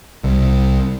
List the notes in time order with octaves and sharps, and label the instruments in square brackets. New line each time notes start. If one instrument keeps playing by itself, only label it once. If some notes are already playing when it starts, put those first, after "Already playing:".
[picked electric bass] C2